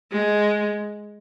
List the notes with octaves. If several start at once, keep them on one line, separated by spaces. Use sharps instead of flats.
G#3